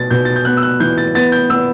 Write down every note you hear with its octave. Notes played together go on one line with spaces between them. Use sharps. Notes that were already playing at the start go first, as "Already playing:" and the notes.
Already playing: B2 A6
B2 G6
A6
G6
B3 F#6
E6
F#6
E3 G6
A6
B3 A6
G6
B3 E6